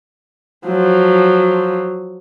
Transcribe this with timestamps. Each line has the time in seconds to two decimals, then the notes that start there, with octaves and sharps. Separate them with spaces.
0.67 F3 F#3